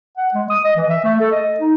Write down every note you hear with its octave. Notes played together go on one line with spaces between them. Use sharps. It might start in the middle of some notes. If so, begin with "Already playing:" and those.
F#5
G#3
D#6
D#5
E3
E5
A3
A4
D#5
D#4